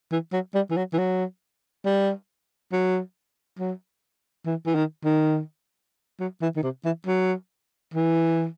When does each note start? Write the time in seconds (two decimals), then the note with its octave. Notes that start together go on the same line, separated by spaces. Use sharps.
0.12 E3
0.33 F#3
0.55 G3
0.70 E3
0.76 F#3
0.93 E3
0.98 F#3
1.85 G3
2.72 F#3
3.59 F#3
4.46 E3
4.66 E3
4.75 D#3
5.04 D#3
6.20 F#3
6.42 E3
6.56 D#3
6.63 C3
6.85 E3
7.07 F#3
7.94 E3